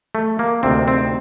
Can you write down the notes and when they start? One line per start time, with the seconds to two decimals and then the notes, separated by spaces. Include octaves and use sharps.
0.15 A3
0.39 A#3
0.63 D2 C3 D#3 C4
0.88 C4